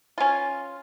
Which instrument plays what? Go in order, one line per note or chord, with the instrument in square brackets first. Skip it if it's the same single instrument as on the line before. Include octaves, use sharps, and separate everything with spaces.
[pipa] C#4 F4